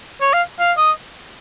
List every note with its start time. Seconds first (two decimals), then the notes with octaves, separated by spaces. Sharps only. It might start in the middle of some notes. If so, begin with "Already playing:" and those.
0.21 C#5
0.33 F5
0.59 F5
0.77 D#5